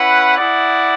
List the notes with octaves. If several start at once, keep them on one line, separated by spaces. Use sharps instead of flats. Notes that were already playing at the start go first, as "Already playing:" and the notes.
Already playing: C#4 E4 B4 F#5
E4 G#4 D5 F#5